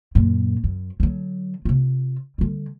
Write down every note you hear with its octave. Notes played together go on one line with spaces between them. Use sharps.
F#2 A#2
F#2
D3 F#3
C3 F4
D3 G3